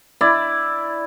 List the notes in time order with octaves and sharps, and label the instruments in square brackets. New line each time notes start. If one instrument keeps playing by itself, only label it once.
[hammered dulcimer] E4 D5